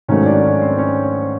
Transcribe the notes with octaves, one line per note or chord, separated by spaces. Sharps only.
G#2 D#3 F#3 A3 C#4 C#5
D4 D5
C#4 C#5
C4 C5
C#4 C#5